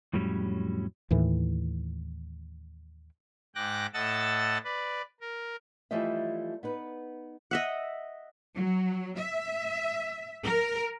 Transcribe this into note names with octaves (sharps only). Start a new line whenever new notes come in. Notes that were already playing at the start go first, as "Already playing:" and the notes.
F2 A2 F#3 G3 C#4
D#2 A2 E3
G#2 G5 D6 F#6 A#6
A2 D#5 F#5 A5 E6 A6
B4 D5
A#4
E3 F3 G3 A3 D#5 E5
B3 D#4 B4
D#5 E5 F#5
F#3
E5
A#4